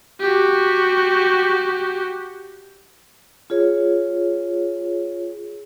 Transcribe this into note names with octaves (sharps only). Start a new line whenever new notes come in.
F#4 G4
F4 G#4 C#5